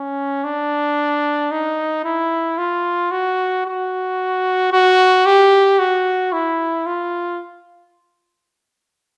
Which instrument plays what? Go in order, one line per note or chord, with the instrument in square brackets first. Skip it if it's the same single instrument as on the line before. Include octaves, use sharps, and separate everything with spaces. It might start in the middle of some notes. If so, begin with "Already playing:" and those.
Already playing: [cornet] C#4
D4
D#4
E4
F4
F#4
F#4
F#4
G4
F#4
E4
F4